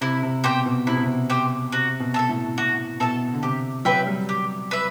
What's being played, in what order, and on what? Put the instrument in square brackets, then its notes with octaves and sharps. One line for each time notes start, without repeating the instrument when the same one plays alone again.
[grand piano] C3 [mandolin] E4
[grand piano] C3
[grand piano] B2 [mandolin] G4 C5 G5
[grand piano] B2
[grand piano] C3 [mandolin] E4
[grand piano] B2
C3
[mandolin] G4 C5 G5
[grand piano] C3 [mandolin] F#4
[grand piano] B2
[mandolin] A4 E5 A5
[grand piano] A2
[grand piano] A2 [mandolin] F#4
[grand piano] B2 [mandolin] A4 E5 A5
[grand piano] D3
[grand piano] C3 [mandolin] G4
[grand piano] F#3 [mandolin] B4 E5 G5
[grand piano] G3
[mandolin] G4
B4 E5